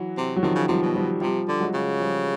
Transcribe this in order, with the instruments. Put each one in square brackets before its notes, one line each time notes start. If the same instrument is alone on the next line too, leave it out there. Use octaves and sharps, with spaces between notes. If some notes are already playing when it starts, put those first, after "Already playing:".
Already playing: [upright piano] E3 F#3
[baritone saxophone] C3
[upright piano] F#3
[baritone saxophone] C3 [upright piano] D#3 F3
[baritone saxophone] C#3
[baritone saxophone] C3 [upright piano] F3 G3
[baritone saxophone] B2
[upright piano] F3 G3
[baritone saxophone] C3 [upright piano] F3 G3
[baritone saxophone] D3
[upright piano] F#3 G#3
[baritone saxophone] C#3
[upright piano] F3 G3